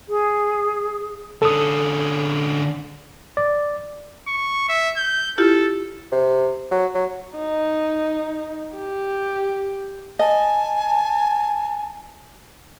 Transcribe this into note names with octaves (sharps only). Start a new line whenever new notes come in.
G#4
D3 C#4 A4 D#6
D5
C#6
E5
G6
E4 F4 G4 A4
C3
F#3
F#3
D#4
G4
D#5 G#5 A5